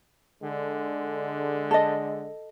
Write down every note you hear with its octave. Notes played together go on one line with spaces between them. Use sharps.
D3 G#3
A4 D#5